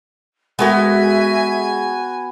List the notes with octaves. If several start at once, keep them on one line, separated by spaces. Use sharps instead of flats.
G#3 B3 F#4 A4 A#4 E5 G#5